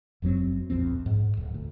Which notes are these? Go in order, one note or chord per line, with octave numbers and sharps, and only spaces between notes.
F#1 F#2 F#3 C4
D1 A#1 F2 C4
G#2
D1
D2